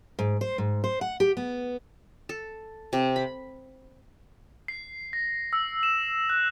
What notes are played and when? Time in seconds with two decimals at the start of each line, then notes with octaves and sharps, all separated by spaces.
0.19 G#2
0.41 C5
0.58 G#2
0.84 C5
1.01 F#5
1.20 G4
1.37 B3
2.29 A4
2.93 C3
3.16 B5
4.68 C7
5.13 A#6
5.53 E6
5.83 E7
6.30 F#6